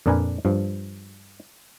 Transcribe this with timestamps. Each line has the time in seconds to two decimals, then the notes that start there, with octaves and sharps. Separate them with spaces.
0.06 F2 A#2 D4 A#4 B4 G#5
0.45 G2 F3